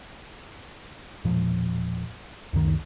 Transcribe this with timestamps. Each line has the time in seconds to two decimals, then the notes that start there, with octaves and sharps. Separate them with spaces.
1.25 E1 A#2 F3
2.53 C#2 F#2 D#3